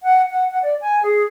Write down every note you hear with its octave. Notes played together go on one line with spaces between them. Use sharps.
F#5
F#5
F#5
D5
G#5
G#4